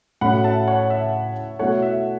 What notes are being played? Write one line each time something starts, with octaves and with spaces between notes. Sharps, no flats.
A2 A3 C#4 F#4 F#5 B5
E5 A5
C#5 F#5
E5
B2 A3 E4 A4 C#5 F#5
E5